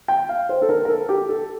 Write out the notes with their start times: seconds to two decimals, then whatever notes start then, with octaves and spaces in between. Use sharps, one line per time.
0.08 G5
0.29 F5
0.49 C5
0.62 A4
0.69 A#4
0.85 A#4
0.89 A4
1.09 G4
1.29 A4